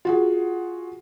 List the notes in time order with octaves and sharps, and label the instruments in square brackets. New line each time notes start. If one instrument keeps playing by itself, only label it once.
[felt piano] F4 F#4 G#4